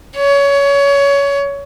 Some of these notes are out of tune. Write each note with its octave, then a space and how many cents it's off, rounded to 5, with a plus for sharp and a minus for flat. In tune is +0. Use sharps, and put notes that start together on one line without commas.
C#5 +20